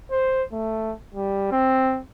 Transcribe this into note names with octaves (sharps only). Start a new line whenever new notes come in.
C5
A3
G3
C4